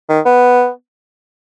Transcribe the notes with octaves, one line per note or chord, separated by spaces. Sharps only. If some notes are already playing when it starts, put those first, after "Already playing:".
D#3
B3